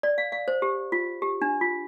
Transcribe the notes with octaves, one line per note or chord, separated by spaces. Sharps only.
D5
F5
F5
C5
G4
F4
G4
D4
F4